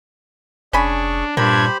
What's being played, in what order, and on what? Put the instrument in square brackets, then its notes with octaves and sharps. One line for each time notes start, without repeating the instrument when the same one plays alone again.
[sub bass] F1 [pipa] C#4 G#5 B5 [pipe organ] D4 [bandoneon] G#4 C#6
[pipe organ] G2 D4 G#6 [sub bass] A#2 [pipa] A#3 [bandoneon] G4 C5 B5